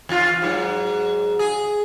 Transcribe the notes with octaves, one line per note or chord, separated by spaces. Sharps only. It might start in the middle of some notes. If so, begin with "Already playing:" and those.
E2 F4
G#2 F#3
G#4